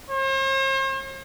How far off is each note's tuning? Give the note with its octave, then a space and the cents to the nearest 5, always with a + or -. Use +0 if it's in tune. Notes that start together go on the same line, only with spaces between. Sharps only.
C5 +45